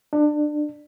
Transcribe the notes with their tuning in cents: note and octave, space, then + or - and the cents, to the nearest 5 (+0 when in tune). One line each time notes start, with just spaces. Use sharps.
D4 +25